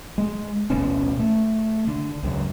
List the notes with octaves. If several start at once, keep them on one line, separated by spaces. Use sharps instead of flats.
G#3
D1 A1 B2 C#4
A3
D3
C#2 F#2